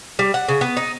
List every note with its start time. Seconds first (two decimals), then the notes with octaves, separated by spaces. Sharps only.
0.19 G3
0.34 F#5
0.48 C#3
0.61 B3
0.77 D#4